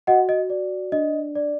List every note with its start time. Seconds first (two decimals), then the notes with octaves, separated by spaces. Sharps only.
0.07 F#4 D#5 F#5
0.29 D#5
0.50 D5
0.92 D4 D#5
1.35 D5